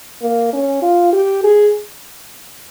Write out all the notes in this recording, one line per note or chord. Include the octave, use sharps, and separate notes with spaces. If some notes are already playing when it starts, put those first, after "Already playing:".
A#3
C#4
F4
G4
G#4